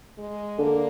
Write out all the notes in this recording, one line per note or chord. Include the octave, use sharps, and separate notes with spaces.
G#3
D3 A#3